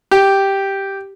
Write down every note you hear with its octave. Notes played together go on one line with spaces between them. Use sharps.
G4